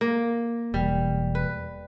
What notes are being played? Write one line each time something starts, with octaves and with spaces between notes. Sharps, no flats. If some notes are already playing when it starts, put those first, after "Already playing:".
A#3
E1 G3
B4